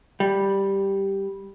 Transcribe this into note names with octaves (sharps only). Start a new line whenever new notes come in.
G3